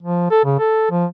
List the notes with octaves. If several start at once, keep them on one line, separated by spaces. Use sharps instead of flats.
F3
A4
C#3
A4
F3